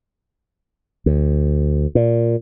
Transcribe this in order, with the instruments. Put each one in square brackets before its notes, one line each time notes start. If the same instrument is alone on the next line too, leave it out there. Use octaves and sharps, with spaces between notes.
[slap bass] D2
A#2